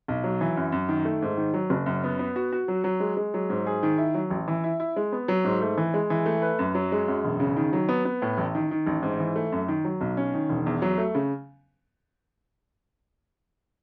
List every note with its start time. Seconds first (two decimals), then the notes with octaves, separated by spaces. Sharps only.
0.08 B1
0.24 F#3
0.41 E3
0.57 F#2
0.72 F#2
0.89 D#3
1.05 A3
1.22 G#2
1.37 D#3
1.54 F#3
1.70 F#1
1.86 F#2
2.04 B3
2.19 B3
2.36 F#4
2.53 F#4
2.68 F#3
2.84 F#3
3.00 G#3
3.17 G#3
3.34 F#3
3.50 G#2
3.67 G#4
3.83 D#3
3.98 E4
4.14 F#3
4.30 A1
4.48 E3
4.64 E4
4.80 E4
4.96 G#3
5.12 B3
5.28 F#3
5.44 G#2
5.61 A3
5.77 E3
5.94 G#3
6.10 E3
6.26 A3
6.42 B4
6.59 F#2
6.75 F#3
6.92 G#3
7.08 F#2
7.24 E1
7.40 C#3
7.56 D#3
7.73 F#3
7.89 B3
8.05 B3
8.22 A2
8.38 A1
8.55 D#3
8.71 D#3
8.87 A1
9.03 G#2
9.20 E3
9.36 A3
9.52 F#2
9.68 D#3
9.85 F#3
10.01 B1
10.17 C#4
10.34 D#3
10.49 E1
10.66 E2
10.82 F#3
10.98 A3
11.15 C#3